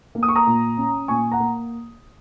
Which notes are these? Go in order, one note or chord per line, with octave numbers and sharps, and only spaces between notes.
A#3
D#6
C#6
A#5 D#6
A#2
C#4
A#2 G#5 C#6
F#5 A#5
A#3